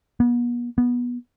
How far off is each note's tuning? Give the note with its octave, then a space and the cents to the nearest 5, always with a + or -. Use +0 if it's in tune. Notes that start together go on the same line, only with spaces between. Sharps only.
B3 -40
B3 -20